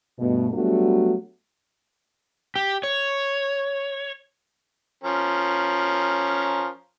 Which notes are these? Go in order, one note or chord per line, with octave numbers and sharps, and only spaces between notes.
G2 B2 A3
F#3 G3 A3 B3 D4 F#4
G4
C#5
F3 C#4 A#4